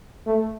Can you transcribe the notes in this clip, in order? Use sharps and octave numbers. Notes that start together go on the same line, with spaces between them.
A3